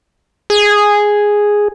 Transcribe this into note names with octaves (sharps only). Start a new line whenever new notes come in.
G#4